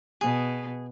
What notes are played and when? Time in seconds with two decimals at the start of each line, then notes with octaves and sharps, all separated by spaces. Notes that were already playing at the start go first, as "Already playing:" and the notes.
0.21 B2 G#4